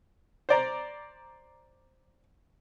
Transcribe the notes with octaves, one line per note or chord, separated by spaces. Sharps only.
C5 D5 A#5